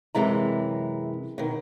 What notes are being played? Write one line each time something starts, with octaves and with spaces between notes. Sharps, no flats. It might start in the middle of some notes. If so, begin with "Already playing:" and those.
F#2 C3 E3 G#3 A#5
B2 D#3